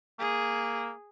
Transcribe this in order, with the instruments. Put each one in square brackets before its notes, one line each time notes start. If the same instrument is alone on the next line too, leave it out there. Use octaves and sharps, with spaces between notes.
[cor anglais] A#3 [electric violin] G#4